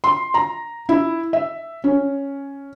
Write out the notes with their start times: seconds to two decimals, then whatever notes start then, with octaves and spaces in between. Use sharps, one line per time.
0.04 C6
0.34 A#5
0.89 E4
1.33 E5
1.84 C#4